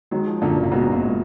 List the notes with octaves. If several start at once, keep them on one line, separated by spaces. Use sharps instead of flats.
D#3 F#3 G#3
F3
F#2 A#2 D3
F#1
A#2
F#1 G#2 B2
F#2
A#2
G#3